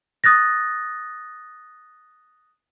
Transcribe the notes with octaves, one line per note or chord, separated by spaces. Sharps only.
D#6 F#6 A6 A#6